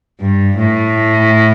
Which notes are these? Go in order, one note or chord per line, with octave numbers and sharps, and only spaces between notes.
G2
A2